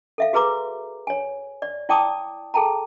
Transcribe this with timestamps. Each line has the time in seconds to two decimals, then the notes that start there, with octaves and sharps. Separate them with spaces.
0.18 A4 E5 F5
0.33 F#4 G#4 B4 A#5 D6
1.07 C#5 G#5
1.62 D5
1.89 E4 D5 G5 A5 D6 D#6
2.54 G#4 A4 G5 A5 A#5